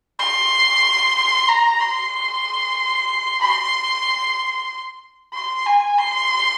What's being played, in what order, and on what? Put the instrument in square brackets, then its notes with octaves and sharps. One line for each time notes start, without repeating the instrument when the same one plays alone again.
[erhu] C6
A#5
C6
C6
C6
G#5
C6